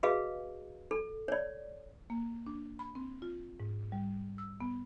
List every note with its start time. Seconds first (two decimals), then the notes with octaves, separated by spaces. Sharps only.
0.03 F#4 G#4 B4 D#5 F5
0.91 A4
1.28 C#5 D5
2.10 A#3
2.46 D4
2.79 B5
2.95 C4
3.22 F4
3.60 G#2
3.92 G3
4.38 E6
4.61 B3